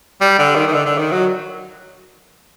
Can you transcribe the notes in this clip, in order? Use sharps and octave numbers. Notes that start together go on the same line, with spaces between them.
G3
D3
D#3
D#3
D3
D3
D#3
F#3